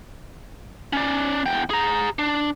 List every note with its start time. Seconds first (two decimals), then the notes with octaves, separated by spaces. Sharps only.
0.93 C#4 D5
1.46 E2 G5
1.70 G#4 A#5
2.19 D4